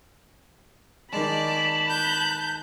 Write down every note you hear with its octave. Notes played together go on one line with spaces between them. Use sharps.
D#3 G#3 D5 A5 B5
F#6 G6